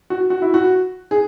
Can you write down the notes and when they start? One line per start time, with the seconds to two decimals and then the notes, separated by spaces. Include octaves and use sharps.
0.10 F#4
0.30 F#4
0.42 E4
0.54 F#4
1.11 G#4